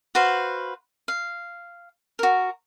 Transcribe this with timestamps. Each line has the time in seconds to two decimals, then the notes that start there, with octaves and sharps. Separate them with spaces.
0.15 F#4 B4 C5 F5
1.08 F5
2.19 F#4 A#4